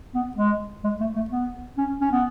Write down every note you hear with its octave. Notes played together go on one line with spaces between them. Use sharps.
B3
G#3
G#3
A3
A3
B3
C#4
C#4
B3